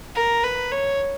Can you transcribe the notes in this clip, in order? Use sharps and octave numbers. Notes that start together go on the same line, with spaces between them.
A#4
B4
C#5